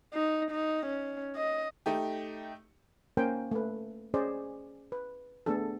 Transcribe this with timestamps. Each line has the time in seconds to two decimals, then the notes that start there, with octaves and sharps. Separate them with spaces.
0.14 D#4
0.51 D#4
0.86 C#4
1.36 D#5
1.86 A3 D#4 G4
3.17 A#3 C#4 A#4 C5 G5 G#5
3.51 A3 B4
4.14 C#4 G#4 C5 D5 D#5
4.92 B4
5.46 A3 B3 D4 G#4 A4